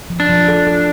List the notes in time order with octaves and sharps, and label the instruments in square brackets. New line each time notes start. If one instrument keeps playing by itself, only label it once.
[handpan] F3
[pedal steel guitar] D4
[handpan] F3
A4
A4